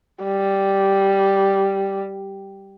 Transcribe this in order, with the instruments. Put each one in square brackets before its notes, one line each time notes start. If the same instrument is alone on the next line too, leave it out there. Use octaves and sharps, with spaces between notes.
[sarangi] G3